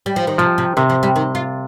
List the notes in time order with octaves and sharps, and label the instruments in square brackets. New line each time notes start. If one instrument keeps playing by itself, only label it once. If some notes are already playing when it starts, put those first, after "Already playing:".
[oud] G3
F3
D#3
[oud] C3 [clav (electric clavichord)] F3
[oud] C3
[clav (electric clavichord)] C3 [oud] D#3
[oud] F3
G3
D#3
F4